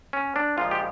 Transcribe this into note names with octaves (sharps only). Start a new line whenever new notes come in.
C#4
D4
A#2 F3 G#3 F4
G4